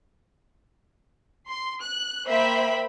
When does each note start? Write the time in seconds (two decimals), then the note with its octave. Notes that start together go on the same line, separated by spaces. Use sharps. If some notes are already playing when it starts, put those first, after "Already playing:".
1.49 C6
1.85 F#6
2.28 A#3 C5 E5 G5 B5